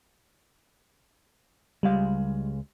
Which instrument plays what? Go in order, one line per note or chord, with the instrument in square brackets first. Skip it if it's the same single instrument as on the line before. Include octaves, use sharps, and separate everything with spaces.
[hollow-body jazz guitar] C#2 G#3 F5 [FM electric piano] G3